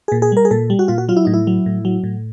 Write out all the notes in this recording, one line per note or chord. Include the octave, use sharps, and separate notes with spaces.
A#2 G#4
G#4
G3 A#4
G#4
A#2 A4
G3
F#4
A#2 F4
F#4
F#3 F4
E4
A2 D#4
E4
F#3
A2
F#3
A2